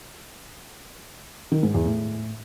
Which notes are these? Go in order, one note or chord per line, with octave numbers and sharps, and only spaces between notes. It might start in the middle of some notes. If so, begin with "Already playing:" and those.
D#3
G#2
E2
A2